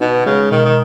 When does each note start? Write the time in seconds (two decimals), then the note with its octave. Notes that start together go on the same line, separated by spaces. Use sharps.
0.01 B2 D#4
0.26 C#3 G#3
0.51 B2 D#3
0.65 D#3